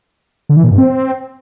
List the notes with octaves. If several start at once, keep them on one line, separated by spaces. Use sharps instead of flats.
D3
E3
A#2
G2
C4